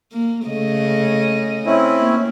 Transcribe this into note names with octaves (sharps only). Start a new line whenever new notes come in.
A#3
C#3 A3 D#5
C4 C#4 E4
A#3